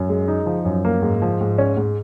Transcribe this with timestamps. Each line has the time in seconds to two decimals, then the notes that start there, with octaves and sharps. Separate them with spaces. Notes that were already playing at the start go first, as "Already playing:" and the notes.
Already playing: F#2
0.09 G#3
0.28 D#4
0.46 F3
0.65 F#2
0.85 A#3
1.02 G#2
1.22 F3
1.41 G#2
1.58 C#4
1.77 G#2